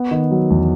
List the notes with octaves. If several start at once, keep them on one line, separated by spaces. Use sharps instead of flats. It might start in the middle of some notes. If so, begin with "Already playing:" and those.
Already playing: B3
D#3
F#3
E2